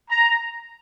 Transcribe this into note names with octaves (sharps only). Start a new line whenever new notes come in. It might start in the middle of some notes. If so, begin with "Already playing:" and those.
A#5